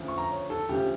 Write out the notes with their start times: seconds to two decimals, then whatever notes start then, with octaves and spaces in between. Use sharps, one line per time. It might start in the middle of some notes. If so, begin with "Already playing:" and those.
Already playing: D2 C#3 F3
0.08 C#6
0.18 A#5
0.31 C#5
0.50 A4
0.69 D2 C#3 F3 G4